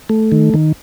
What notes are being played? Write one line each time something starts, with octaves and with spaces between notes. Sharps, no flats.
A3
D#3
D#3